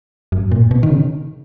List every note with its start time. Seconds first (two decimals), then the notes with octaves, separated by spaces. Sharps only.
0.32 F#2
0.51 A#2
0.71 B2
0.83 D#3
0.90 C#3